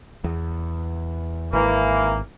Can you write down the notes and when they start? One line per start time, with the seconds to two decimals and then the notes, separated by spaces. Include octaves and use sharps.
0.24 E2
1.53 G#1 E3 A#3